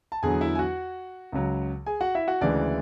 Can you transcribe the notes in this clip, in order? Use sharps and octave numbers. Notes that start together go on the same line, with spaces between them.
A5
E2 D3 F#3 G#4 G#5
E4 E5
G#5
F#4 F#5
C#2 C#3 F#3
G#4 G#5
F#4 F#5
E4 E5
F#4 F#5
D2 C#3 E3 G#3 D4 D5